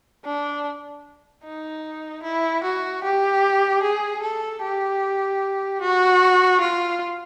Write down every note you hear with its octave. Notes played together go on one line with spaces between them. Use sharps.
D4
D#4
E4
F#4
G4
G#4
A4
G4
F#4
F4